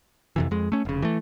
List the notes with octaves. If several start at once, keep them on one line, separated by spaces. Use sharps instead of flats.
F2 C3 E3
F2 G#3
A3 C#4
F1 C#3
E3 A3